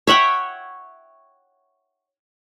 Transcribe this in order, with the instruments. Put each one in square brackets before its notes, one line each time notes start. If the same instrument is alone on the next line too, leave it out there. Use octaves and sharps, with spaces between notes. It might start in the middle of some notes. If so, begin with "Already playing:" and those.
[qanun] C#5 E5 F#5 G5